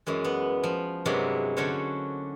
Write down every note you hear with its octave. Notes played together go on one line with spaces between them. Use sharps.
F#2 E3 G#3
B3
F3
G2 C3 F#3 G#3 A#3 E4
D3 C#4 F#4 C5 C#5